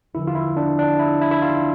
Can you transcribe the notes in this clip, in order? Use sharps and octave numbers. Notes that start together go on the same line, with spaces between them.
E2 D3 F3 E4
F4
E4
D4
D4
E4
E4
E4
F4